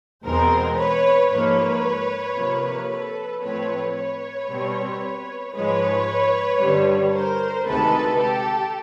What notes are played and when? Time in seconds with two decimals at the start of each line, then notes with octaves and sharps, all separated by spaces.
0.25 E2 B2 G#3 C4 A#4 C5
0.78 B4 C#5
1.30 G#2 F3 A#3 B4 C#5
2.37 C3 F3 A#3
2.89 A4 B4
3.42 A2 F3 A3 C4 B4 C#5
3.96 B4 C#5
4.49 B2 G3 C4
5.54 G#2 F3 G#3 B4 C#5
6.61 G2 D3 G3
7.14 A#4 C5
7.66 D2 C3 D#3 G#3 A4 B4
8.20 G4 A4